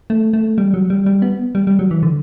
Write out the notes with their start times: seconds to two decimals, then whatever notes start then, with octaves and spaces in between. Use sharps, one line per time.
0.10 A3
0.33 A3
0.58 G3
0.74 F#3
0.90 G3
1.06 G3
1.22 B3
1.55 G3
1.67 G3
1.79 F#3
1.91 E3
2.03 D3